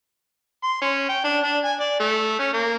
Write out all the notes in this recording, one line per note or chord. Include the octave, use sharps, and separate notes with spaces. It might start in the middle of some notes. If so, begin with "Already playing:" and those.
C6
C#4
G5
D4
D4
G#5
D5
A3
C#4
A#3